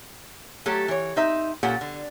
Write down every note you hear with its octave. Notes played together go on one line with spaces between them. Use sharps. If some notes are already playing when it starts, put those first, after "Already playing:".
F#3 A3 G4 A4
E3 C#5
C4 D#4 E5
A#2 C#4 G4 A4 F#5
D3